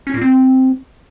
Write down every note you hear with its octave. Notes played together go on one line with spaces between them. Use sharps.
C#4
A#2
C4